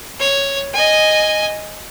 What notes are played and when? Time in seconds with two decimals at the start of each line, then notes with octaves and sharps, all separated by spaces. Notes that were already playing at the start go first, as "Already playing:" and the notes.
0.20 C#5
0.73 D#5 G#5